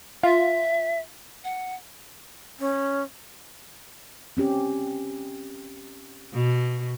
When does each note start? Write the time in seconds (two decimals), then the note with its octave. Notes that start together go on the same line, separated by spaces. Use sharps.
0.23 F4 E5
1.44 F#5
2.60 C#4
4.37 C4 C#4 G4
6.33 B2